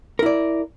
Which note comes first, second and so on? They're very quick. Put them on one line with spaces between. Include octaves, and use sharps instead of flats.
A#4 E4 D5